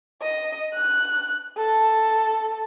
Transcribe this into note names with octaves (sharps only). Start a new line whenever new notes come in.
D#5
F#6
A4